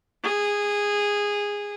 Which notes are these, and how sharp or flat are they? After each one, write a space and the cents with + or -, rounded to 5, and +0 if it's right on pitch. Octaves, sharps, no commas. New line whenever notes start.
G#4 -15